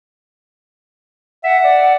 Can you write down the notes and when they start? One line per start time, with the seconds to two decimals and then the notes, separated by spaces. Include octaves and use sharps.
1.44 E5 F#5
1.64 D5